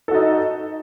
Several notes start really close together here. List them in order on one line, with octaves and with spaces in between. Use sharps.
A4 F#4 D#4